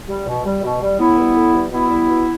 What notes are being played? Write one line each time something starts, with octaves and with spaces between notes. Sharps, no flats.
G3
B2
G3
B2
G3
A2 B3 E4
E3 G3
A2
E3 G3
B2 B3 E4
G3
B2